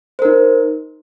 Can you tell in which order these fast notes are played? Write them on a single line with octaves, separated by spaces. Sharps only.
C5 A#4 D#4